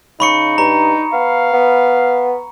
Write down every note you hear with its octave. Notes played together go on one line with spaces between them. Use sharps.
C#3 D#4 B5 C#6 C#7
G2 A#5
B3 F5
B3